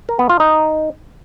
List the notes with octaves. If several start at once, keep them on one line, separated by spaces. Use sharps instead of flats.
A#4
B3
F4
D#4